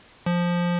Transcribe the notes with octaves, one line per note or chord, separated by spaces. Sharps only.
F3